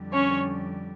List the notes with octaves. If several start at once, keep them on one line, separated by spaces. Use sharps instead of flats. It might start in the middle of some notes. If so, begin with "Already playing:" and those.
Already playing: F2 D3 G3
C#4 C#5